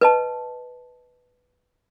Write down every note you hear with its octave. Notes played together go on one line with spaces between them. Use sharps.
B4 D#5 A5